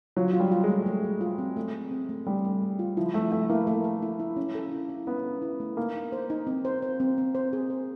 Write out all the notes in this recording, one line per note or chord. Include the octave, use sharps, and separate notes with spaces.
F#3 F4
F4
G3
F4
G#3
A3
A3
A3
F4
C4
A3
A3
C4
A3
G3 A3
A3
A3
F4
F3 E4
A3 E4
A3 E4
A#3 E4
A3 A#3
A4
E4
E4
C#4
A4
E4
E4
B3 C#4
A4
E4
A3
A#3 D#4
D#4
C5
D#4
C4
C5
C5
C4
C4
C5
G#4
C5